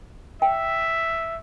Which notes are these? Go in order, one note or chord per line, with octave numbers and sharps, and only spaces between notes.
E5 G5